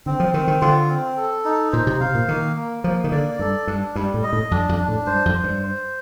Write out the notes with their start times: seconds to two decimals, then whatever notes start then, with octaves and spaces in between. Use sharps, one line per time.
0.06 D3 C4
0.20 F3
0.34 D#3 C4
0.48 D#3
0.61 D3 F4
0.90 C4
1.17 A4
1.45 D#4
1.72 A#2 C5
1.87 C3
2.00 C3 F5
2.15 A#2
2.28 D#3 A#3
2.57 A#3
2.84 F3 A#3
3.04 D#3
3.12 D3 D5
3.39 G2 A4
3.67 G2 D4
3.96 G2 G3
4.14 A2
4.23 D#5
4.33 A2
4.51 F2 D4
4.69 F2
4.79 D4
4.88 A2
5.06 G2 C5
5.25 F2
5.34 C5
5.44 G2
5.63 C5